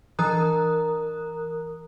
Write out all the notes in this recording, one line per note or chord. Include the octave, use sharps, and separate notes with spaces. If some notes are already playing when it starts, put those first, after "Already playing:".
E3 A#4 A#5 D#6 F#6